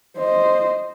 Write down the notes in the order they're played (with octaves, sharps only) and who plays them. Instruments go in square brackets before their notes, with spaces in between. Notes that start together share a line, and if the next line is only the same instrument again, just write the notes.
[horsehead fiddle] C5 D#5